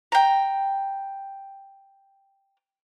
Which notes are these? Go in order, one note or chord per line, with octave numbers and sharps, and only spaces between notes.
G5 A#5